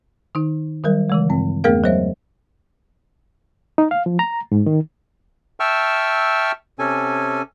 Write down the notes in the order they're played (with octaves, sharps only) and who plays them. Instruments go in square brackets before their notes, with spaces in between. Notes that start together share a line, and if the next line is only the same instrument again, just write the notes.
[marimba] D#3 D#4
D#3 F#3 G3 A#4
C#3 E3 G#3
G2 C4
E2 A3 B3 G#4 A#4 F5
F#3 G#3 C5 C#5 E5
[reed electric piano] D#4
F5
F3
A#5
G#2
D#3
[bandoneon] E5 G5 A5 C#6 E6 F6
C3 C#4 A4 G#5